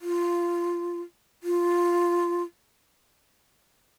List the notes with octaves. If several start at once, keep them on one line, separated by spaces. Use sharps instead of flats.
F4
F4